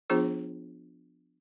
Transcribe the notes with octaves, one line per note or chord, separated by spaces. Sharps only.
F3 B3 D4 F4 G#4 C5